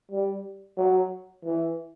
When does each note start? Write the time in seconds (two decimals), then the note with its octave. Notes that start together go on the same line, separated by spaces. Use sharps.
0.11 G3
0.77 F#3
1.45 E3